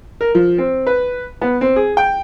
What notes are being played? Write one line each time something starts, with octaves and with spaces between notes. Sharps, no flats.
A#4
F3
C4
B4
B3
C4
G#4
G5